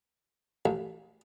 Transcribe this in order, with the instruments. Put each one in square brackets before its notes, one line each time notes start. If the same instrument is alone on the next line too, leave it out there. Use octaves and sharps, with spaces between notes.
[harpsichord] A1